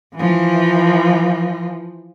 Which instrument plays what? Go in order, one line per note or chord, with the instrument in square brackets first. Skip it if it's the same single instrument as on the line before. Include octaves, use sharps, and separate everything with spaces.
[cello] E3 F3